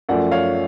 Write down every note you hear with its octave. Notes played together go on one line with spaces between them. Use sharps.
F#2 F3 A3 D5 F#5
C#5 F5